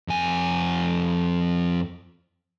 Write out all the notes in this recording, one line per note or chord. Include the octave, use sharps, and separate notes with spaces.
F2 G#5